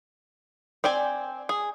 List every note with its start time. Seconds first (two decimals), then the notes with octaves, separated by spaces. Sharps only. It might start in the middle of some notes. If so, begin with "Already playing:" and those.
0.84 C4 D5 G5 G#5
1.49 G#4